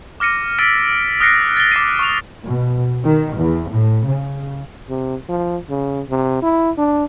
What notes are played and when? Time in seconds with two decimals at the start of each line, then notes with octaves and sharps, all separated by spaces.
0.20 D6 F6 A#6 C#7 D#7
0.59 E6 F6 A6 B6 D7 D#7
1.20 D#6 F6 F#6 A#6 C7 C#7
1.57 A6 G7
1.72 D6 A#6 C7 D#7
1.99 C#6 D#6 F7
2.43 B2
3.04 D#3
3.37 E2
3.71 A2
4.05 C#3
4.89 C3
5.29 F3
5.70 C#3
6.10 C3
6.42 E4
6.78 D4